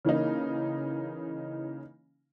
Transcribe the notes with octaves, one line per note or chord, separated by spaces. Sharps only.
C#3 E3 A#3 D#4